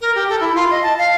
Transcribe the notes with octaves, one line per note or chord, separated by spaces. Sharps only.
A#4
G4
A4
E4
F4
D#5
A5
F5